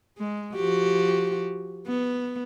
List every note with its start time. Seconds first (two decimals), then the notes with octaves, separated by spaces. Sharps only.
0.18 G#3
0.55 F3 F#4 G4
1.86 B3